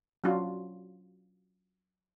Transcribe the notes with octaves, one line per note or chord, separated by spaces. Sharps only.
F#3 C#4 D4 F4 F#4